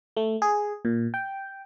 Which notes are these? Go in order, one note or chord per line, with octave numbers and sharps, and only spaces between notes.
A3
G#4
A#2
G5